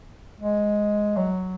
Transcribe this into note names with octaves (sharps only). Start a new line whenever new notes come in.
G#3
F#3